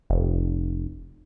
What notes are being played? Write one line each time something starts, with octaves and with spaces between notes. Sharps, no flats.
F1